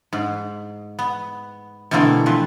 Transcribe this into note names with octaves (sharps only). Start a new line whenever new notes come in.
G#2
B3
B2 D3 E3 A3 A#3 C4
F3 C4 B4